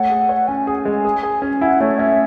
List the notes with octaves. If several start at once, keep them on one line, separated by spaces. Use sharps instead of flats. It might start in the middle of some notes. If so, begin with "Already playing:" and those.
Already playing: A3 C#5 F#5
G#4
C#5
C#4 G#5
G#4
G#3
G#4
G#4
C#4
E4 F#5
A3 C#5
C#4 E5